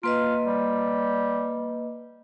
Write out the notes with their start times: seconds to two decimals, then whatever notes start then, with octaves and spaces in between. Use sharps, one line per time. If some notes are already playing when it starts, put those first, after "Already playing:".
0.03 A#3 F4 B4 D#5
0.45 G3